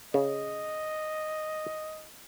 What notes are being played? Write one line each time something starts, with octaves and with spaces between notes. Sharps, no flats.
C#3 D#5